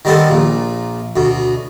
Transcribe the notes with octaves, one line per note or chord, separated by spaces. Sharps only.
D#3 G3 B3 C4 A4
A#1 A#2
D2 B2